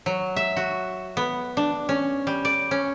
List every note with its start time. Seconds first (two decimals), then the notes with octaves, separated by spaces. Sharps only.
0.06 F#3
0.36 E5
0.56 F#4
1.17 B3
1.57 D4
1.89 C#4
2.27 G3
2.45 D5
2.71 C#4